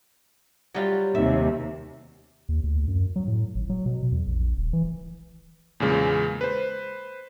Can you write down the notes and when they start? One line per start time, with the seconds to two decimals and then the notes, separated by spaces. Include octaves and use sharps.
0.74 F#3 G3 F4
1.15 D#2 C3 E5
2.49 D#2
2.64 D2
2.88 F#2
3.16 F#3
3.28 A2
3.55 G#1
3.69 F#3
3.86 B2
4.12 E2
4.27 A#1
4.57 D#1
4.73 E3
5.80 E2 A#2 C#3 G#3
6.41 B4 C5